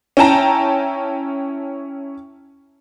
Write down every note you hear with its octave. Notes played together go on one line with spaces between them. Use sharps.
C#4 E4 G5 A5 A#5